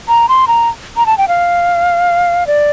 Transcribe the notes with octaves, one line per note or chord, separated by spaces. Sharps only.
A#5
C6
A#5
A#5
A5
G5
F5
D5